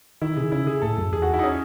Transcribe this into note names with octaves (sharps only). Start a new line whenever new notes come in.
D#3 E4
C3 G#4
D#3
C#3 E4
G#4
A2 A4
F#2
E2 G#4
F#4
E4
D#4
C#4